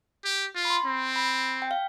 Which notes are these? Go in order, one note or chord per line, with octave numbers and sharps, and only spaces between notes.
G4
F4
B5
C6
C4
B5
G5
F5